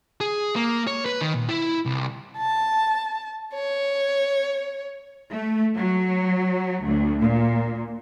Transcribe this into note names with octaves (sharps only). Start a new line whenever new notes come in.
G#4
A#3
C#5
B4
D#3
A#2
E4
C2
A5
C#5
A3
F#3
D2
A#2